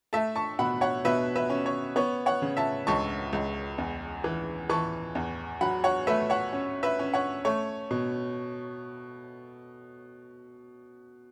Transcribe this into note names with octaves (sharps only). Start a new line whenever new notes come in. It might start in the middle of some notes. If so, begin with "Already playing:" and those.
A3 E5 A5
A5 C#6
B2 F#5 B5
C#5 F#5
B2 B4 E5
B4 E5
C#4
C#5
B3 C#5
C#5 F#5
C#3
E5 A5
C#2 A5 C#6
C#2
E2
E3
E3 A5 C#6
E2
F#3 F#5 B5
C#5 F#5
A3 B4 E5
C#5 F#5
C#4
B4 E5
C#4
C#5 F#5
A3 C#5
B2